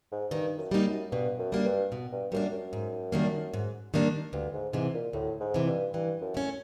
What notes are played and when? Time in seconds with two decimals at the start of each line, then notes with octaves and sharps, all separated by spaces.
0.12 G#2
0.31 G2 D#3
0.58 F#2
0.71 G3 A#3 D#4
0.85 F#2
1.12 G2 B2
1.39 F#2
1.52 G3 A#3 D4
1.65 G2
1.92 B2
2.12 G2
2.32 F#2 G3 A#3 D4
2.52 F#2
2.73 G#2
3.12 D#3 G3 A#3 D4
3.54 G#2
3.94 D#3 G3 A#3 D4
4.33 D2 G2
4.53 G#2
4.73 G#2 C3 E3
4.94 A#2
5.13 D2 A2
5.40 G#2
5.54 C3 E3
5.67 G2
5.94 G2 E3
6.21 F#2
6.34 A3 C#4